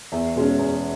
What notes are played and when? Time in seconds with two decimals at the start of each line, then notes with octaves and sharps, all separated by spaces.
0.12 E2 E5
0.36 B2 G#3 C#4
0.59 E2